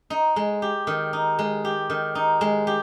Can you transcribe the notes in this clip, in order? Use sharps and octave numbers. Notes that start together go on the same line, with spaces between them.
D#4
G#3
G4
D#3
D#4
G#3
G4
D#3
D#4
G#3
G4